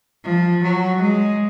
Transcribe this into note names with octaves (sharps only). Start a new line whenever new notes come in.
F3
F#3
G#3